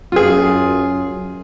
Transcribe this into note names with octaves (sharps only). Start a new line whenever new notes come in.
F#2 F4 G#4